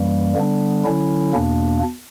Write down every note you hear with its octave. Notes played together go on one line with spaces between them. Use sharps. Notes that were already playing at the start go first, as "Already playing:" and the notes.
Already playing: F#2 E3 G3 A#3
D3 G3 B3 D4
D3 F#3 C#4 E4
E2 B2 A#3 D4